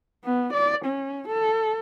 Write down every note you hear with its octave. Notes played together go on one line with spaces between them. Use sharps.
B3
D5
C#4
A4